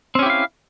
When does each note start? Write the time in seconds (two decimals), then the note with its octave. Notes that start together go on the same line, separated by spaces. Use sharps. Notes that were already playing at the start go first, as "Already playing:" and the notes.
0.15 C4
0.19 C#4
0.23 G4
0.26 E4
0.30 F5